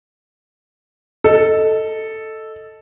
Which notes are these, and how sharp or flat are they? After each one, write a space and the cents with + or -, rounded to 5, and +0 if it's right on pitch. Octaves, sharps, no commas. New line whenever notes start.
A4 +0 D#5 +0